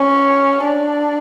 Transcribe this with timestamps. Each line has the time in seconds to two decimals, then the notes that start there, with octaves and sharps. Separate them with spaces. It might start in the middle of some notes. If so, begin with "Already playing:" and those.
Already playing: C#4
0.63 D4